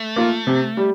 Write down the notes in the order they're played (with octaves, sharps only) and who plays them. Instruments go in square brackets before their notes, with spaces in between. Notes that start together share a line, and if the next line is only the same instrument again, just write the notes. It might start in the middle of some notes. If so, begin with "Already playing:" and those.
Already playing: [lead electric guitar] A3
[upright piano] A#3 F4
C3
G3